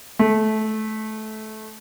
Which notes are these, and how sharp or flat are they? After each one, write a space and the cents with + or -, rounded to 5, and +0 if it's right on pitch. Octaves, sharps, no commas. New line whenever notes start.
A3 -20